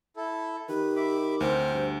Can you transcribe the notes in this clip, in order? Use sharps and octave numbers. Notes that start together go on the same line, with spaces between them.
E4 A4
D#3 G4 B4
E5 B5 D6
D2 C4 C5 F6
G2